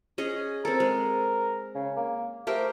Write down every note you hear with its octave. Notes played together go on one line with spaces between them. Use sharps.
C#4 G#4 D#5
C4 A4 A#4
G#3
C#3
A#3
A3 G4 A#4 C5